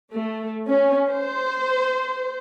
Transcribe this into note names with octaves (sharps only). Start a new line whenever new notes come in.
A3
C#4
C5